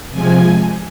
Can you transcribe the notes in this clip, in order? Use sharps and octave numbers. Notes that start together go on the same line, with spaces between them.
C3 F3 G#3 G#5